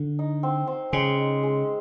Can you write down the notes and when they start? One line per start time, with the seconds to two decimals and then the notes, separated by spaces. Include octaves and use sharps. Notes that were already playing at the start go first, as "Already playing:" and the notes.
Already playing: D3
0.19 D#4
0.43 C4
0.67 C4
0.92 C#3 G#3
1.18 D#4
1.43 G#3